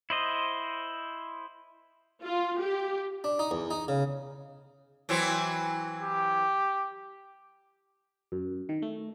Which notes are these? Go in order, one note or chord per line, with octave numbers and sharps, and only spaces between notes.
E4 C5 D#5
F4
G4
D4
D#4
E2
D#4
C#3
E3 F#3 C4
G4
F#2
D#3
A3